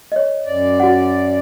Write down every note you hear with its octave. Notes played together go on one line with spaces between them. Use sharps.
C#5 D#5
F#2 D5
F#4 F#5